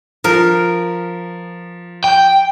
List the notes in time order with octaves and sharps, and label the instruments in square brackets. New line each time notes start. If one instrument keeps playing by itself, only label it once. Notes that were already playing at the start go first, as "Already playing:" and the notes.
[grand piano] F3 [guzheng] A#4
[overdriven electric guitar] G5